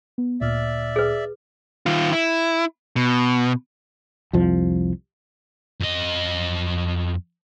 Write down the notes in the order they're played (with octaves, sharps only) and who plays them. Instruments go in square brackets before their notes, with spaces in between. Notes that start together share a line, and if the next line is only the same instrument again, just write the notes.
[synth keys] B3
[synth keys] D2 A#2 F6 [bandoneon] D5 E5
[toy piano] G#4 B4
[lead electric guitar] D#3 F4
E4
B2
[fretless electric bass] C2 F2 F3
[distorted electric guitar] F2 D#5